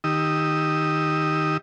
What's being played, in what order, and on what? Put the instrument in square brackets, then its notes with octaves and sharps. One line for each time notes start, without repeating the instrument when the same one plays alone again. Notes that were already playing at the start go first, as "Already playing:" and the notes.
[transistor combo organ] D#3 D#4 G4 D#6 E6